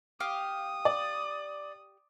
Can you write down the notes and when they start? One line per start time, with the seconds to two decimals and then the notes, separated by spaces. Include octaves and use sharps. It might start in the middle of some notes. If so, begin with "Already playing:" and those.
0.20 G4 F5 D#6
0.85 D5